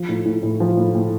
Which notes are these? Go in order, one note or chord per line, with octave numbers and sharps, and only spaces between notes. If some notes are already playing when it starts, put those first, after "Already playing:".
Already playing: F3
A2
A2
A2
F3
A2
A2